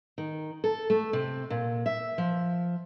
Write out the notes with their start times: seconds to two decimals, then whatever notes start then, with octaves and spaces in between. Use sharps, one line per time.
0.18 D#3
0.64 A4
0.90 A3
1.13 C3
1.50 A#2
1.86 E5
2.18 F3